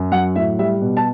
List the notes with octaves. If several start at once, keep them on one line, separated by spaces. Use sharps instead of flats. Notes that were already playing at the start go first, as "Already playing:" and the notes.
Already playing: F#2
F#3 F#5
A2 E5
G3 E5
B2
A5